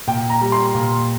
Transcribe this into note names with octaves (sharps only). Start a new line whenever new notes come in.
A#2 G5
A#5
G3
C6
A#2